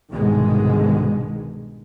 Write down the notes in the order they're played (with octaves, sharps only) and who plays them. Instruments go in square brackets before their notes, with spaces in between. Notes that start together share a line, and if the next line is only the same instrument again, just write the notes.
[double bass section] C2 G#2 B2 D3 D#3 G#3